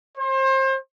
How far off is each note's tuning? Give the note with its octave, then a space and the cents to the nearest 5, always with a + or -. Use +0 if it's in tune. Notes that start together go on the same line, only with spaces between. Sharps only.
C5 +30